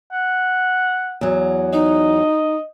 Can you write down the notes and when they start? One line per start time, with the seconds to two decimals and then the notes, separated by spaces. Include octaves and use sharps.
0.12 F#5
1.21 E2 F#3
1.73 D#4 D#5